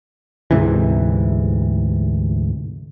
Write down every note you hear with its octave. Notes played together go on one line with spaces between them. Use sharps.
D2 G#2 C3 E3